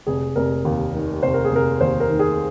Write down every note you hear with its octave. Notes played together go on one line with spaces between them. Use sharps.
F1 G#4
F1 A#4
D#2
D#3
F1 C5
A#4
G#4
F1 A#4
D#2 C5
A#4
D#3
G#4